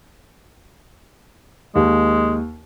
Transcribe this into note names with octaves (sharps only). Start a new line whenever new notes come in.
D#2 G#3